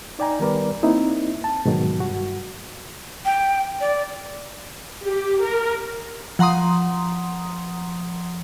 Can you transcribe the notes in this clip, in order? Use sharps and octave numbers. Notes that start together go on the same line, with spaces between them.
D#4 D5 G5 G#5 A#5
D#3 G3 B3 A#4 B4 D5
A#3 C4 D#4 E4
A5
G#2 B2 D#3 F#3
G2 F#4
G5
D5
G4
A#4
F3 F#5 A#5 C6 D#6